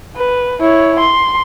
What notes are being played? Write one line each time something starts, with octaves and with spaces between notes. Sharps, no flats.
B4
E4 C#5
C6